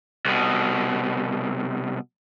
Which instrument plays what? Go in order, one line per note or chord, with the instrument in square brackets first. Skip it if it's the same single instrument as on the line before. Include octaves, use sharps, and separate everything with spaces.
[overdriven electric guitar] C2 B2